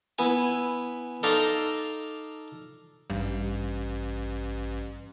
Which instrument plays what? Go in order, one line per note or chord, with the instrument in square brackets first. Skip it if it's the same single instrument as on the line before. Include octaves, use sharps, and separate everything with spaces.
[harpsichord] B3 E4 G#5
D#4 A4 D5 F5 A#5 C6
[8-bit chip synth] A1 [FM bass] G2